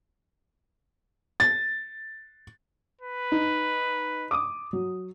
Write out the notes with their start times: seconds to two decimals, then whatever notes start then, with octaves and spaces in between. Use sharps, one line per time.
1.40 A6
3.02 B4
3.32 D#4
4.31 D6 D#6
4.73 F#3